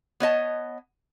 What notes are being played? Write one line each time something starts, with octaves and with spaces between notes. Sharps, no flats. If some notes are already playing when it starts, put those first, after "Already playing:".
B3 C#5 D#5 A5